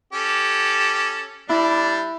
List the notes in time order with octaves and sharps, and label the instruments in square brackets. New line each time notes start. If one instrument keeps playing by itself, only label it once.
[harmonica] C#4 G4 A4
[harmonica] G3 D4 [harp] E4